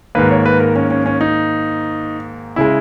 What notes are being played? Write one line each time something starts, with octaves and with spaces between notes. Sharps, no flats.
G#2 D#3 A#3 B4
C#5
B4
A#4
C#4
C#4
C#4
D#4
C#3 G#3 E4